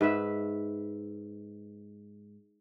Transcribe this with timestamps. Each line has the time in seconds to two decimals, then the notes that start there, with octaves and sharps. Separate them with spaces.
0.01 G#2 B4 E5